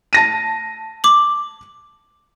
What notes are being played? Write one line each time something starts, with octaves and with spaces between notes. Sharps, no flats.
A5 A#6 D#7
D6 F#7